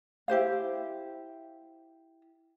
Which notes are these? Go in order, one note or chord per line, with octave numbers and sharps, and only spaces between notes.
E4 G4 C5 F5